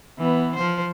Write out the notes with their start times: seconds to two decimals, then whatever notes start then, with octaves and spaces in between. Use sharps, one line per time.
0.19 E3 B3
0.55 F3 C5